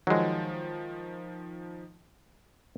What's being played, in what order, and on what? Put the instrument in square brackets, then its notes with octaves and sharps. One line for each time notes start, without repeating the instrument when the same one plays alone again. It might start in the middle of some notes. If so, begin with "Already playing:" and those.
[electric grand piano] D#3 F3 [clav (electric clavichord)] F#3 G#3